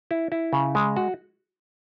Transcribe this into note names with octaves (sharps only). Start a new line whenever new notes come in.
E4
E4
C#3
G#3
F#4